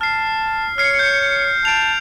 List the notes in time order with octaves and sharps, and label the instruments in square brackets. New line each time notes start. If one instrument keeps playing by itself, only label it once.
[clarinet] A5 [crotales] F6 C7
[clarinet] C#5 [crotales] F6 C7 C#7
[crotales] G6
[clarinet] A5 [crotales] D7 F7